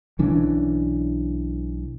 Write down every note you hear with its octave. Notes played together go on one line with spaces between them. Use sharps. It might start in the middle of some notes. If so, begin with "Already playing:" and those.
B1 E3 C#4 D4